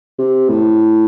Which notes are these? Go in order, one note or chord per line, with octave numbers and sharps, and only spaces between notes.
C3
A2